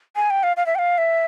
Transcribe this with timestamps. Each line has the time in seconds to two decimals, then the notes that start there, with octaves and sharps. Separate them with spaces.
0.16 G#5
0.30 G5
0.43 F5
0.57 F5
0.66 E5
0.75 G5
0.79 F5
0.98 E5